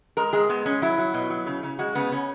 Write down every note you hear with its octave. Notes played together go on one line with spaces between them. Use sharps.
G#3 A#4
G#3 G#4
G#3 B3
G#3 C#4
F#3 E4
F#3
B2
F#3
C#3
C#3
G#3 F#4
C#3 B3
C#3 C#4